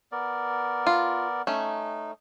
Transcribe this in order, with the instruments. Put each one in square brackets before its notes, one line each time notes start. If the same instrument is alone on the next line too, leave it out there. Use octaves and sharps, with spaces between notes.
[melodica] B3 A#4 D5
[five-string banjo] F4
[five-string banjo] A3 C#4 [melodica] D#4